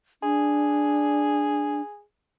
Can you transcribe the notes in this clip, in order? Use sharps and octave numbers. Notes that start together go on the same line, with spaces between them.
D4 G#4